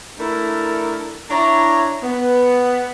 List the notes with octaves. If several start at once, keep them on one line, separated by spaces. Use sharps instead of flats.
A3 D4 E4 A#4
D4 E4 C#5 A#5
B3